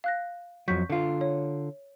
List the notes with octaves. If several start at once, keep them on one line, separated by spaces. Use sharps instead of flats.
F5 F#6 A#6
F2 F#3 C#6 G6 B6
D3 F4
C#5